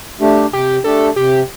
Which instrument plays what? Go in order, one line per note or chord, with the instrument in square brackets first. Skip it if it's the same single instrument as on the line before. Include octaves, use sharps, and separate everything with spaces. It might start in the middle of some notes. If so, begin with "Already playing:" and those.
[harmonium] A3 D4 G4
[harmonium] C3 [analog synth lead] G4
[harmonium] A3 D4 G4 [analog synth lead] A4
[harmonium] C3 [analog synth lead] G4